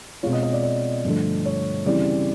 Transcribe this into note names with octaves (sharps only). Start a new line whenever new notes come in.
B2 G#3 C4 F4 C#5
D#5
D#5
D5
D5
G2 D3 F3 A3
C#5
C#3 E3 G3 C4 D5